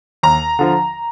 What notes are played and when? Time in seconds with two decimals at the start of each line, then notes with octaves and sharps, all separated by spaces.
0.23 D#2 A#5
0.59 D3 F3